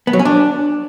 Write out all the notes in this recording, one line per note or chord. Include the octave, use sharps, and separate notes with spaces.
B3
F#3
C#4
D4